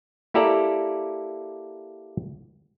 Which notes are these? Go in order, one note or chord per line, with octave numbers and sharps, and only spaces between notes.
A#3 E4 G4 A4 D5 A#5